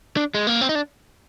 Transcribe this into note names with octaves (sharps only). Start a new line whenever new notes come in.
D4
G#3
A#3
C4
D#4
D4